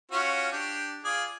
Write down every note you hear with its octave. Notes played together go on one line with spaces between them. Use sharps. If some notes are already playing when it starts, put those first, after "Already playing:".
C#4 F4 F#4
D4 G4
F4 G#4 D5